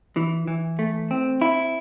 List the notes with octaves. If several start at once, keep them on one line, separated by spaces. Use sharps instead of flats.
E3
E3
A3
C4
E4